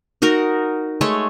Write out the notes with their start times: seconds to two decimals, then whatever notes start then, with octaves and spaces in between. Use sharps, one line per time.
0.22 D#4 F#4 A#4
1.01 G#3 A3 C#5